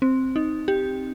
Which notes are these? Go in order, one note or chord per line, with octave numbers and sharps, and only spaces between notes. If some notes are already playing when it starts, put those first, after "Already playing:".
C4
D#4
G4